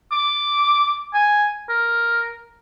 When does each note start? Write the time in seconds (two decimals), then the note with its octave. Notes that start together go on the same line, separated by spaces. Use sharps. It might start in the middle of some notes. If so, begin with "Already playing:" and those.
0.12 D6
1.14 G#5
1.69 A#4